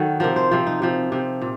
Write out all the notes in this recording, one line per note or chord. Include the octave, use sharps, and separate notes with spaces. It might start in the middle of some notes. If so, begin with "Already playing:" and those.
Already playing: D#3 F#3 A4
C3 F3 A#4
C5
C3 F3
D#4
C3 F3
C3 F3
A#2